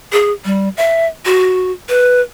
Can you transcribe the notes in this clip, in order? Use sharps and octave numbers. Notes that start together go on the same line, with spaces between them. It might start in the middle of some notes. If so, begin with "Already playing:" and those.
G#4
G3
E5
F#4
B4